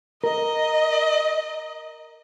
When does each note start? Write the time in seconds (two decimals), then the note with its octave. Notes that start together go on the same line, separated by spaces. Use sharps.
0.24 A#4 D#5